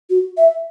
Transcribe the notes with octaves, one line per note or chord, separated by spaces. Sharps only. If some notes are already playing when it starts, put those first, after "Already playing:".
F#4
E5